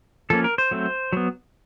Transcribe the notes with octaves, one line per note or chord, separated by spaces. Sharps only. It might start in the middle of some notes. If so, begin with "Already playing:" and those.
F3 A#3 C#4 A4
A#4
C5
F#3 A3 C4
F#3 B3